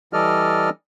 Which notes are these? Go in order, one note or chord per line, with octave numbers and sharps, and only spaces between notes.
E3 G3 A4 D5 D#5 F6